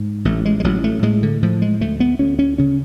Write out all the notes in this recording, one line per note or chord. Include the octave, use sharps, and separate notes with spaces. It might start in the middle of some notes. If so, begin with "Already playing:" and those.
Already playing: G#2
A1 A3
G#3
G#3
A1 F#3
A3
A2 G#3
D3
A2 F3
G#3
D2 A3
B3
D2 C#4
C#4
C#3 C#4